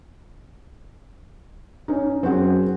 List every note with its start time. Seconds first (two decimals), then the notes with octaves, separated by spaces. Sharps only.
1.88 C#4 D#4
2.23 F#2 C4 F#4 G#4